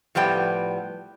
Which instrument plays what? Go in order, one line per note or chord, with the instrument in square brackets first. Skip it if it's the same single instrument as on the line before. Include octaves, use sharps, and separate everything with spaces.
[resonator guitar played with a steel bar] A2 F3 G3 B3 G5